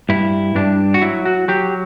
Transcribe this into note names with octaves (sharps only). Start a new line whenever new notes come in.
G2 E4
G2 D4
F#4
F#3 E4
F#4
F#3 G4